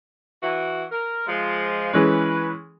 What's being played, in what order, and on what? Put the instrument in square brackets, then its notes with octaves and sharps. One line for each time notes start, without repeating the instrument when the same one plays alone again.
[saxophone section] E3 F#4
A#4
F3 G#3
[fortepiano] E3 G#3 C#4 [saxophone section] B4